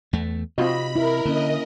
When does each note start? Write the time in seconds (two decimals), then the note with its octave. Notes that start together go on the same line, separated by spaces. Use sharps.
0.13 E2 A3
0.58 C3 C4 F4 F#4 D#5 B5
0.96 E4 A#4
1.25 D3 A#3 C#4 D#5